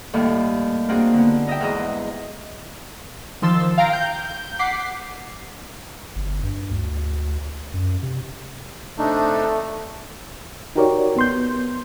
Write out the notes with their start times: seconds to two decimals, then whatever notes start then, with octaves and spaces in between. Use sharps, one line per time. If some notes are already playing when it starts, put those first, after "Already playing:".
0.13 D#2 A2 G3 A4 C#6
0.89 A#3 C4 D4 F#4 G#4
1.14 D3 B3
1.47 D#4 D#5 E5 G5
1.61 E2 G#2 E4 G#4 D#5
3.42 D#3 F3 C6 E6 A6
3.78 F5 G5 A#5 A#6 D7
3.93 G6
4.59 F#5 D6 B6 C7
6.16 G1
6.43 G2
6.71 D2
7.74 F#2
8.03 C3
8.98 C3 A3 D4 D#4
10.76 D#4 F#4 G4 A#4 C#5 D5
11.17 B3 C6 G6